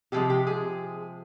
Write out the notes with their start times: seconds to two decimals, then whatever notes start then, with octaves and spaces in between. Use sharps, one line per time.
0.12 C3 F3 G#3 G4
0.30 G4
0.47 G#4